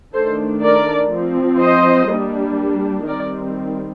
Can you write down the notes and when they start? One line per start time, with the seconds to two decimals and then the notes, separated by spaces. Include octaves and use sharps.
0.14 D#3 A3 D4 A4 C5
0.63 A#4 D5
1.12 F3 C4
1.60 C5 D#5
2.09 G3 A#3 D4
3.06 D#3 G3 C4 A#4 D5